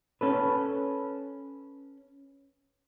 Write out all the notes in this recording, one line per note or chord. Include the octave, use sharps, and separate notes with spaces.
C#4 A4 B4